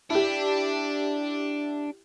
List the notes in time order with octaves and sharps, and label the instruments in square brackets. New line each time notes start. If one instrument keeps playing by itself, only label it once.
[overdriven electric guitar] D4 [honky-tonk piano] E4 G4